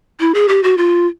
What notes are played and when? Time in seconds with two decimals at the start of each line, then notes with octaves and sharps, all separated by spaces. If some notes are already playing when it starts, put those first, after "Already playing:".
0.20 E4
0.34 G#4
0.48 G4
0.64 F#4
0.77 F4